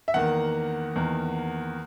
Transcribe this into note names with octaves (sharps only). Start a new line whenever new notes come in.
E5
E2 D#3 A#3 F#5
E2 D#3 A#3